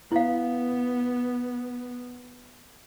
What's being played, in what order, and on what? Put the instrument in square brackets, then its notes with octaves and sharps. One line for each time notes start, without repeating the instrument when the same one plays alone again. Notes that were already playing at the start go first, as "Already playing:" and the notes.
[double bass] B3 [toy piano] E4 F5